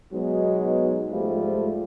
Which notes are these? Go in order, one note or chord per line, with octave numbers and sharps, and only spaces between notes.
B2 F#3 G#3 B3 D#4
G#2 F3 G3 A3 F4